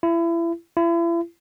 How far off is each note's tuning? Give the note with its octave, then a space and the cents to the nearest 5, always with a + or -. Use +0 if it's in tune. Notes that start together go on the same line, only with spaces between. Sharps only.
E4 +30
E4 +40